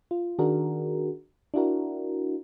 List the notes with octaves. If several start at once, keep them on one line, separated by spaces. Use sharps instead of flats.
F4
D#3 D4 F#4 G#4 A#4
D4 E4 F#4 A#4